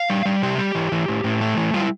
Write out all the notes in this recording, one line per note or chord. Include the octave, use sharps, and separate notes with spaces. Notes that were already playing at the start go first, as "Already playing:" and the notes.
Already playing: F5
G3
G3
C3 G4
G3
E3
E3
A2
A2
A3
E3
G3 F4
E4